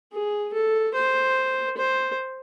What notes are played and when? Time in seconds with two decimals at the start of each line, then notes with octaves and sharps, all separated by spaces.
0.13 G#4
0.53 A4
0.94 C5
1.77 C5